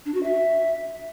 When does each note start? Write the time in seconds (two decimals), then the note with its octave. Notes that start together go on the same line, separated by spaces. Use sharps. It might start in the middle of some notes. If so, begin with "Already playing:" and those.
0.05 D4
0.14 F#4
0.23 E5